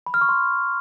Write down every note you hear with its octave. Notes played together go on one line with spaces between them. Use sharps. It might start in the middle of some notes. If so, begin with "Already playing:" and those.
B5
F6
C#6
C6